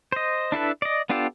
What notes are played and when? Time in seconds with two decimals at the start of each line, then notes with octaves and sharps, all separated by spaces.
0.12 C5 D#5
0.52 D4 E4 A4 B4
0.82 D5 D#5
1.09 B3 D4 F4 G4 A4